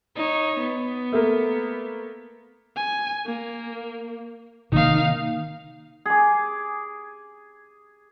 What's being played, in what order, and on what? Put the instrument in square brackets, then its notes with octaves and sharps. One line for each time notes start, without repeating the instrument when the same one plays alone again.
[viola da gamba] D#4 C#5
B3
[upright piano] A3 A#3
[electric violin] G#5
A#3
[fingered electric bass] C3 D#3 A#3 [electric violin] D#4 F5
[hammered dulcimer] G#4 D6